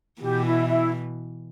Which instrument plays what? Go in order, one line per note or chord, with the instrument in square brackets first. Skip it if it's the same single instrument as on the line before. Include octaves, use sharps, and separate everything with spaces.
[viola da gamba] B2 E3 [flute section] G4
[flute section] E4
E4